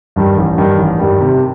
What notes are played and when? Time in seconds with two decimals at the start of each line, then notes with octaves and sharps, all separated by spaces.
0.16 G2 D#3 G3
0.37 A1
0.57 G2 D#3 G3
0.78 A1
0.99 G2 D#3 G3
1.21 C3